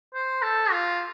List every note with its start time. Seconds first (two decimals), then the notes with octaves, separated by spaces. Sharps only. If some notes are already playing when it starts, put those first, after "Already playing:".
0.14 C5
0.42 A4
0.71 F4